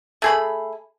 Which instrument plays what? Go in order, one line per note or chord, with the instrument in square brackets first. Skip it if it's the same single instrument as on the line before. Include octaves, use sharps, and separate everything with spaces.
[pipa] A3 G#4 B5